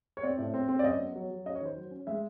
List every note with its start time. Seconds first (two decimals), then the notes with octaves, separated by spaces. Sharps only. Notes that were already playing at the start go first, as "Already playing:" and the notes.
0.17 C#5
0.23 C4 D5
0.38 A2
0.54 C4
0.69 C4
0.79 D5
0.84 F#2 D#5
1.00 B3
1.16 F#3
1.30 F#3
1.46 C#4 D#5
1.55 C#5
1.61 D#3 C5
1.76 F#3
1.91 C#4
2.07 G#3 E5